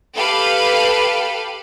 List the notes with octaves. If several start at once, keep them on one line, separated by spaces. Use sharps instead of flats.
G4 A4 B4 F5